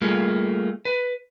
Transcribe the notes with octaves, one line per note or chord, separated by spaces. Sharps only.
G3 A3 A#3 F4 G#4
B4